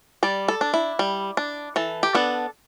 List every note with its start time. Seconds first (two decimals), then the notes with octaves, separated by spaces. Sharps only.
0.23 G3 D5
0.48 A4
0.61 D4
0.74 E4
0.99 G3
1.37 D4
1.76 E3 A4
2.03 G4
2.15 B3 D4 A4